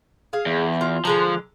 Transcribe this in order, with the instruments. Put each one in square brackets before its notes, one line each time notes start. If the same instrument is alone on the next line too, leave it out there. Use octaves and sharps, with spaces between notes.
[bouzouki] G#4 F5
[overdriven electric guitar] E2
[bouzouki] F4
[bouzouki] D3 G#3 A#5 [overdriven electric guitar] F3